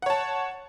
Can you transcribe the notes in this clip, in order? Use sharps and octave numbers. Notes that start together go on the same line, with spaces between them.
C#5 F#5 A5